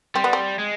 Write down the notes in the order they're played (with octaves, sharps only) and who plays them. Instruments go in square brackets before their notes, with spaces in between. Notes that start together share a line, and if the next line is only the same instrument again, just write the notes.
[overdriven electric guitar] G3 [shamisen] C4
[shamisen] B3
C4
[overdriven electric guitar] G#3